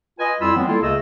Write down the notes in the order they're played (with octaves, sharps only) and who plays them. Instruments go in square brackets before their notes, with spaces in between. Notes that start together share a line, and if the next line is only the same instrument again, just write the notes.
[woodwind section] F4 B4 D#5 G#5
F2 G3 E4 F4 B5 E6
E3 F#3 G#3 B3 C4
G3 A#3 E4 F4 A4
C#2 C#3 A3 G#4 D#5 E6